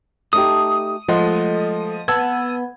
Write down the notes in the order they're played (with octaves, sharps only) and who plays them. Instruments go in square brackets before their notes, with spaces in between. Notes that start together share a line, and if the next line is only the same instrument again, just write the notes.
[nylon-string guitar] A3 D#4 G4 [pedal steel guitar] D#6
[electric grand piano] F3 D#5 C6 [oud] G#3 A3 [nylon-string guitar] F#5
[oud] B3 [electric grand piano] A5 E6 G#6